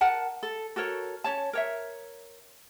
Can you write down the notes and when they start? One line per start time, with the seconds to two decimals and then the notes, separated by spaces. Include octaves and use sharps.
0.01 A#4 F#5 A5
0.43 A4
0.76 F#4 A4 A#4 C#5
1.24 C#4 C#5 A5
1.53 A#4 C#5 E5